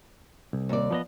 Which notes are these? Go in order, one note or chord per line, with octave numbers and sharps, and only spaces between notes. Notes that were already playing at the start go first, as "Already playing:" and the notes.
C2
D#2 D5
F3 B3 D#5